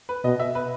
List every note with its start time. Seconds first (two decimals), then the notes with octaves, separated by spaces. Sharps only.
0.09 B4
0.24 B2 D#5
0.40 E5
0.55 B4